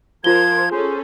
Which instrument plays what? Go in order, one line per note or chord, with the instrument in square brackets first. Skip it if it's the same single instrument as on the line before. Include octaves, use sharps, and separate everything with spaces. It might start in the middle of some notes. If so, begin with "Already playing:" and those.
[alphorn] F3 [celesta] F4 G7 [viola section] A#4 C5 [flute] G#6
[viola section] C#4 A4 [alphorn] G#4 [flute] C5